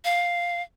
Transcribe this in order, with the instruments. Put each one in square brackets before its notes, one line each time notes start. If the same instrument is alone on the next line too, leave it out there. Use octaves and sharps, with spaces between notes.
[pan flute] F5